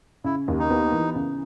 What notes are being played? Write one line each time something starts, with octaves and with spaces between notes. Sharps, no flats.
C#3 E4
D#2
D#4
B3
E3
C#3